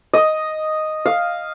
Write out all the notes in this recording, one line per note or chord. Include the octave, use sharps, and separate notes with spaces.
D#5
F5